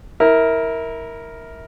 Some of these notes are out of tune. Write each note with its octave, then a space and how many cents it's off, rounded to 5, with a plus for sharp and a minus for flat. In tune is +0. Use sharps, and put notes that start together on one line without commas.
E4 -25 A#4 +0